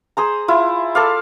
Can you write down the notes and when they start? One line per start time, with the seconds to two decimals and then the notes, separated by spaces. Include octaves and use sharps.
0.17 G#4 C5 A#5
0.48 E4 F4
0.95 A4 D5 F5